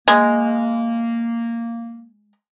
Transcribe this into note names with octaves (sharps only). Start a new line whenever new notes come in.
G#3 A#3